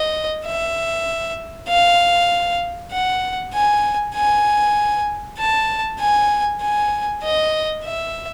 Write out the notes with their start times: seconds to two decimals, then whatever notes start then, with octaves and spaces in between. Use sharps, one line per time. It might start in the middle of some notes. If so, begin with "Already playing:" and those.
Already playing: D#5
0.45 E5
1.68 F5
2.92 F#5
3.53 G#5
4.14 G#5
5.38 A5
6.00 G#5
6.61 G#5
7.23 D#5
7.84 E5